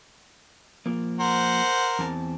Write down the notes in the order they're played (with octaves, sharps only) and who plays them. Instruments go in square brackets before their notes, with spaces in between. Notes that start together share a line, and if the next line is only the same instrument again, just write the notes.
[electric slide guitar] F3 A#3
[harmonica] A#4 C5 F#5
[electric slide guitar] E2 C4 A5